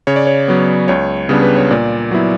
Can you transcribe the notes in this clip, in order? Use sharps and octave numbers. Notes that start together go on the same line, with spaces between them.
C#3 C#5
D5
C#5
F#3 B3
C#2 C#5
C#3 G3 B3 D4
B4
C#5
A#2 D5
F#3 B3 E4